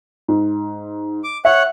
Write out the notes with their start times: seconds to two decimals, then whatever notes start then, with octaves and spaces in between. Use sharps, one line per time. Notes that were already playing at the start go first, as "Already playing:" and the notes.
0.28 G#2
1.24 D6
1.45 C#5 E5 F#5